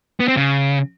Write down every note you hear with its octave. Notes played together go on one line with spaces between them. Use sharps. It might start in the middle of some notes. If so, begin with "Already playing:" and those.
B3
C4
C#3